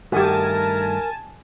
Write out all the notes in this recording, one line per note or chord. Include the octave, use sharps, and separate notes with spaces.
G2 D#3 A3 F#4 G4 A#4 G#5 A5